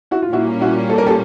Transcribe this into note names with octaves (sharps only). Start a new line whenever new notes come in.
E4 F#4
F4
A#2 G3 A#3 C#4 E4 F#4
E4 F#4
A4
A#4
G4 A4